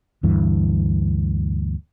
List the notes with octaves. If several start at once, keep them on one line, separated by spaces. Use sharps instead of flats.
D2 G2 E3